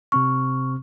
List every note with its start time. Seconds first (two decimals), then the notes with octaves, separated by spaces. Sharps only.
0.12 C3 C4 C#6 F6